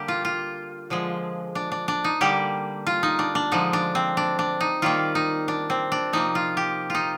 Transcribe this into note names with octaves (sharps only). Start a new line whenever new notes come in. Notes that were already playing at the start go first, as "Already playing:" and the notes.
Already playing: D3 G3 A#3 G4
F4
F4
D3 F3 G#3
D4
D4
D4
D#4
D3 G3 A#3 G4
F4
D#4
D4
D4
D3 F3 G#3 D#4
D4
C4
D4
D4
D#4
D#3 G3 A#3 F4
D#4
D4
C4
D4
C3 F3 A#3 D#4
F4
G4
D#4 F4